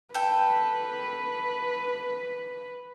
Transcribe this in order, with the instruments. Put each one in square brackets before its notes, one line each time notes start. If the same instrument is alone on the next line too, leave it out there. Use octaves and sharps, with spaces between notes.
[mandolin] A4 G5 [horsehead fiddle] B4